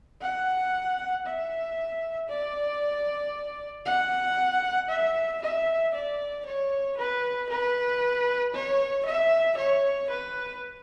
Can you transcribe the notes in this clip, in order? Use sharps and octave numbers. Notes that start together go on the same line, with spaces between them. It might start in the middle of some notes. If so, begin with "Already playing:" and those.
F#5
E5
D5
F#5
E5
E5
D5
C#5
B4
B4
C#5
E5
C#5
B4